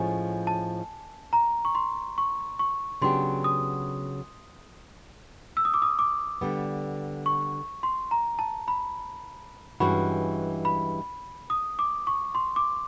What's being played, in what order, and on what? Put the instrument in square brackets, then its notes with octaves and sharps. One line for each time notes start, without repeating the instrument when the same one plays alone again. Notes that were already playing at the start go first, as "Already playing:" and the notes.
Already playing: [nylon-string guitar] A2 F3 G#3 C#4 [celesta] G#5
[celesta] A5
A#5
C#6
C6
C#6
C#6
[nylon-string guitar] C#3 F#3 B3 D4 G4 [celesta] C6
[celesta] D#6
E6
D#6
D6
D#6
D6
[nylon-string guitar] D3 G3 B3
[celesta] C#6
C6
A#5
A5
B5
[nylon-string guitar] G2 E3 G#3 C#4 F#4 [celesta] B5
[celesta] B5
D#6
D6
C#6
C6
D6